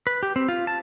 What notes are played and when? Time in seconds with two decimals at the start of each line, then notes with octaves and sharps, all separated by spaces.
0.07 B4
0.23 G4
0.36 C4
0.48 F4
0.67 A5